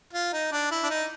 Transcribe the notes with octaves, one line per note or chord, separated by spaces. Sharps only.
F4
D#4
D4
E4
D4
D#4